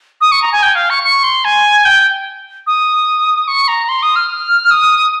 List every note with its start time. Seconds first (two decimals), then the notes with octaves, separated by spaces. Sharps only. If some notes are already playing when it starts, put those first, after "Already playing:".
0.21 D#6
0.32 C#6
0.42 A#5
0.52 G#5
0.63 G5
0.75 F5
0.90 C#6
1.04 C#6
1.23 C6
1.45 G#5
1.85 G5
2.67 D#6
3.48 C#6
3.68 A#5
3.89 C6
4.02 D#6
4.16 F6
4.71 D#6